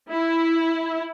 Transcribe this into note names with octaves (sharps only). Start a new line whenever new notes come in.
E4